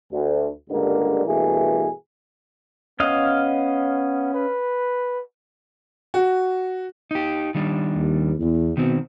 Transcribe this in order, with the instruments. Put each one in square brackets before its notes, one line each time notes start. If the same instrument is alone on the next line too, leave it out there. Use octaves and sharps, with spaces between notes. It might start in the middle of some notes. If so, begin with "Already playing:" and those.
[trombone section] D2
C#2 G2 D3 G3 G#3 A#3
G2 B2 E3 A3 A#3 G#4
[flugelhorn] B3 [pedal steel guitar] C#4 D#5 F5
[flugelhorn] B4
[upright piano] F#4
[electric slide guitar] D#4 G4
D#3 G3 D4
[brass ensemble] D#2
E2
[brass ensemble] B2 [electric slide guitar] D#3 C4